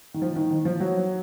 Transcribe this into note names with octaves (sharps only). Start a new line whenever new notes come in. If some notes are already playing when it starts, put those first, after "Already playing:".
D#3
F3
D#3
D#3
F3
F#3